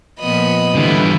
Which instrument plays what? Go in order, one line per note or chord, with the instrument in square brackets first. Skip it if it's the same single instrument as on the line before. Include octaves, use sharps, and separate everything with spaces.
[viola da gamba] A#2 F3 B3 [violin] D#5 B5
[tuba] D3 [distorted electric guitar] E3 G3 [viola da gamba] B3 E4 F4